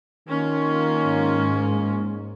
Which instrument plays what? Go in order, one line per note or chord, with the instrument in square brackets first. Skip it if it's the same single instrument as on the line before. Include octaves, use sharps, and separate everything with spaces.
[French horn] D#3 [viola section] A#3 C#4 F4
[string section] G#2